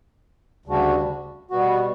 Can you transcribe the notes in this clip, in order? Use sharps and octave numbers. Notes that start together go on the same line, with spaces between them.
D2 C#3 G3 D4 F#4
B2 G3 B3 F#4